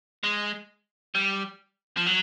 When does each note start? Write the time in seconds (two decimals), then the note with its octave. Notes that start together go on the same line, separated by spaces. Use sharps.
0.23 G#3
1.15 G3
1.97 F3
2.06 F#3